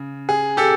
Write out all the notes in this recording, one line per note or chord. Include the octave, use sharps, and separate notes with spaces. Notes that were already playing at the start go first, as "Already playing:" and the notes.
Already playing: C#3
G#4
G4 A4